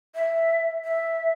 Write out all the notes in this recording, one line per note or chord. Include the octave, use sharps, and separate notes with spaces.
E5
E5